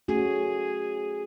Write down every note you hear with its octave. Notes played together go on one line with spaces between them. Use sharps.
A3 C#4 F#4 G#4